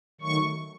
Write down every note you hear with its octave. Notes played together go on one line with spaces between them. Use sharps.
D#3 F#3 A3 C#6